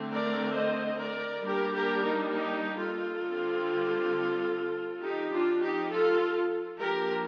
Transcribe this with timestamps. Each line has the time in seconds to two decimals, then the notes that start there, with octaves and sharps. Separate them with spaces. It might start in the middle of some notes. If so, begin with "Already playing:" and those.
Already playing: D3 A3 C4
0.10 A#4 D5
0.54 C5 D#5
0.99 A#4 D5
1.43 G3 A#3 D4 G4 A#4
1.73 G4 A#4
2.03 D#4
2.33 D#4 G4
2.77 F4 A4
3.22 D3 G3 C4
5.00 F3 C4 D#4 G4
5.30 D4 F4
5.60 D#4 G4
5.89 F4 A4
6.78 F3 A#3 D4 G4 A#4